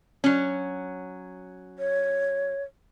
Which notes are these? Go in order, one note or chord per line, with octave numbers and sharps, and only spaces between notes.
F#3 C#4
C#5